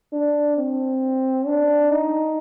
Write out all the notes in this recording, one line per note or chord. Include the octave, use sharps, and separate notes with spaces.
D4
C4
D4
D#4